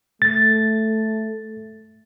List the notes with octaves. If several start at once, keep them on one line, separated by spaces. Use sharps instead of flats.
A3 A6